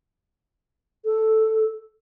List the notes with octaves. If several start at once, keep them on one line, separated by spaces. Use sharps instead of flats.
A4